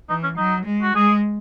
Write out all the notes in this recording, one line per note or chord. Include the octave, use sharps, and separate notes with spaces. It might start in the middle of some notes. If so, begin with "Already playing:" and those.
E3 D#4
C#4
F#3 D#4
G#3
F#4
G#3 G#4